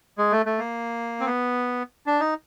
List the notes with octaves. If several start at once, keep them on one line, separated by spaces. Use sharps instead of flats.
G#3
A3
A3
A#3
C4
B3
D4
D#4